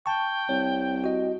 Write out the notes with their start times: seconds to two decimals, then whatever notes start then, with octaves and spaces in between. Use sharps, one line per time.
0.06 G5 A5 C#6
0.49 C2 C#5
1.04 F#4 D#5